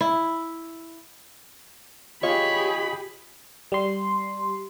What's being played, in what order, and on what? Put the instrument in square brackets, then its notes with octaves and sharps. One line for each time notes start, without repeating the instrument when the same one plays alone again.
[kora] E4
[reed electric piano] F4 D#5 [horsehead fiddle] G4 G#4 [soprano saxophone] C#5 [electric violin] B5
[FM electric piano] G3 C6